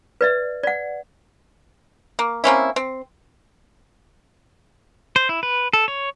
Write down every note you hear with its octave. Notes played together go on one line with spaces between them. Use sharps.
B4 D5 E5
D5 F#5
A#3
A#3 C4 C#4 E4
C4
C5
E4
B4
A4
C#5